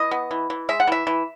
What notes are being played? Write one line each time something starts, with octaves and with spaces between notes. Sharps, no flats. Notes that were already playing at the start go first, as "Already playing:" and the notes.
Already playing: E3 D#5
B3
E3
E3
G#3 E5
F#5
E3 E5
E3